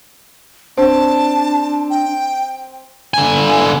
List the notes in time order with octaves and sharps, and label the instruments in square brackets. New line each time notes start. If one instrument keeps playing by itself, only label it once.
[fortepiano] C4 [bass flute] D4 [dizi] A5
[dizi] G5
[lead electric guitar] D3 G#5